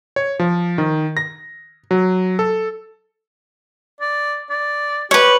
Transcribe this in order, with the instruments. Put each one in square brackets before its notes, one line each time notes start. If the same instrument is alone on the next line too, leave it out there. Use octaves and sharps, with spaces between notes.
[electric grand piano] C#5
F3
D#3
A#6
F#3
A4
[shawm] D5
D5
[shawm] G4 [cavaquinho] B4 C#5